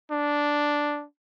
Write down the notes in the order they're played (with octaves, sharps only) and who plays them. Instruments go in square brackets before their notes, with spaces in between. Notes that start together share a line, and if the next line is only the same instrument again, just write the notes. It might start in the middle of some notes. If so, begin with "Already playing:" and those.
[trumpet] D4